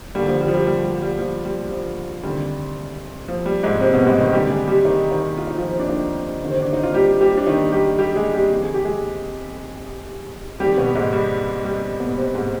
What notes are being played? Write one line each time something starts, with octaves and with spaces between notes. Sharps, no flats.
D#2 D3 G3
F3
G3
F3
G3
G3
G3
G3
F3
G3
F3
D2 C3 D#3 G3
F3
G3
G#2 G#3
C3 C4
B2 B3
G3
G#2 G#3
D#3 D#4
D2 C3 D#3 G3 G4
G#3 G#4
G3 G4
D#3 D#4
D#3 D#4
F4
D#4
F3 F4
C4
D4
D#3 D#4
D2 C3 D#3
C4
D4
D#4
F4
G3 G4
G3 G4
D4
D#3 D#4
G3 G4
G3 G4
G#3 G#4
G3 G4
F2 C3 D#3
G#4
G4
G#3 G#4
F2 D#3 G3 G4
B2 B3
G#2 G#3
G3
G3
B2 B3
C3 C4
G#2 G#3